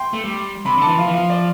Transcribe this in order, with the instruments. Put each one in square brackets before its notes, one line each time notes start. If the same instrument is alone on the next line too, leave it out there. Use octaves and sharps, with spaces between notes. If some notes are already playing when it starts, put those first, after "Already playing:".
Already playing: [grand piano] G5 C6
[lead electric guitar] A3
G3
[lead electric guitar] C3 [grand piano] B5
[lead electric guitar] D3
[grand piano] A5
[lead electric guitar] E3
[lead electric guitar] F3 [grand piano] F5
[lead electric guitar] E3
[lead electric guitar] F3 [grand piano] F5
[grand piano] D5